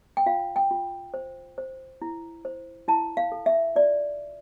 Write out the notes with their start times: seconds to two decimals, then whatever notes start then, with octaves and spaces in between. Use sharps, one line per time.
0.17 G5
0.26 F4 F5
0.56 G5
0.71 F4
1.14 C5
1.58 C5
2.02 E4
2.45 C5
2.88 E4 A5
3.17 F5
3.32 A4
3.46 E5
3.76 F4 D5